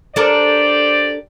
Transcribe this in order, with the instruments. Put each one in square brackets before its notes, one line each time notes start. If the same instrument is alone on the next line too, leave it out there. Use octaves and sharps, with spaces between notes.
[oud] D4 A4 A#4 [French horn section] G4 C5 D5